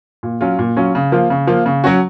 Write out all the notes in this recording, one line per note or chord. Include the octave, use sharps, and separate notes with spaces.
A#2
F#3 C#4 F4
A#2
F#3 C#4 F4
C#3
F3 A#3 F4
C#3
F3 A#3 F4
C#3
F#3 C#4 F#4